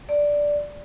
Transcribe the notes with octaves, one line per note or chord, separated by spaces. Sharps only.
D5